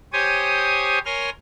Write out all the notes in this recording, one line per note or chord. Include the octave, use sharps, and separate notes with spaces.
G4 C5 C#5 G#5 D#6
A#4 C#5 G#5 C6 F6